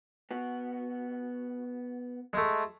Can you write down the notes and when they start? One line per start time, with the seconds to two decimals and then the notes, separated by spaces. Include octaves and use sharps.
0.31 B3 F#4
2.33 G#3 A3